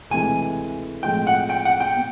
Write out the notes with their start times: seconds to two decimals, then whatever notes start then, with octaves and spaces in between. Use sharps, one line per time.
0.10 D2 C3 E3 G#3 G#5
1.03 A2 F3 G#3 C4 F4 G5
1.27 F#5
1.50 G5
1.65 F#5
1.80 G5
1.96 B2